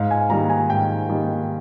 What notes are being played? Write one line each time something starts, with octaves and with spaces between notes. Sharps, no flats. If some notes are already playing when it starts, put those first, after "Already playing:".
Already playing: G#2 F5
G#5
D#3 G3 A#3 A#5
G#5
G#2 G5
D#3 G3 A#3